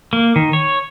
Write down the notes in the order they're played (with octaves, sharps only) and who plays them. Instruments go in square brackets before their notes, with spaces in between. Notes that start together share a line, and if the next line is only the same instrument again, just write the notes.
[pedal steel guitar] A#3
D#3
C#5